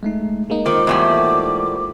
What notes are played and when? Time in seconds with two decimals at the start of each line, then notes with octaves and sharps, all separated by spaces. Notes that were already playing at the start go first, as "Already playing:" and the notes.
0.03 G#3 A3 D#4
0.50 G#3 A#3 D#4
0.66 D#3 F4 A#4 C5 D6
0.87 E2 A2 G3